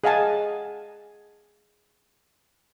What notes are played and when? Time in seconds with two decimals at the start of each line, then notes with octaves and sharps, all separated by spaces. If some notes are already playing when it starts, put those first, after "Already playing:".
0.04 G#4 D#5 F5 F#5 G#5 A5